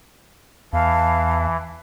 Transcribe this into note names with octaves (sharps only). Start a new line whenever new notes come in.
E2 E3 F5 A5